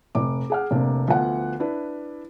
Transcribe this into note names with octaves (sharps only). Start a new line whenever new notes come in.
F1 D6
G#4 F#5 F6
F1 C3 A#3 D4
D2 F3 B3 F#5
D4 E4 B4